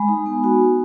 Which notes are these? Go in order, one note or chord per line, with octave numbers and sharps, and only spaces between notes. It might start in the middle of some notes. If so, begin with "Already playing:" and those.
Already playing: G#3 G#5 B5
D#4
B3
F#4
B3